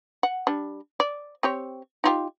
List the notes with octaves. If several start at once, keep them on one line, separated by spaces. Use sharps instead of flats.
F#5
G3 D4
D5
C4 G4 C#5
D#4 F4 G4